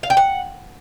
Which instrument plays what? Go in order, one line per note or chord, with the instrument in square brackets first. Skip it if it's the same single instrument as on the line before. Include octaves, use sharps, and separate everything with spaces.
[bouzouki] F5
G5
F#5